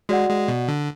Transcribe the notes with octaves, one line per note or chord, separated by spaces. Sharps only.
G#3 F#4 D5 F#5
G#3
B2
D3